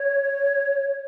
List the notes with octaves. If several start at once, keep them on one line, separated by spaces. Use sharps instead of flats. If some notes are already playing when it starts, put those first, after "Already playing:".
Already playing: C#5